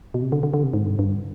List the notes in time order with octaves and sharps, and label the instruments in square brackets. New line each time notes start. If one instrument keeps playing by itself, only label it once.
[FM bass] B2
C3
D3
D3
D3
C3
G#2
G2
G2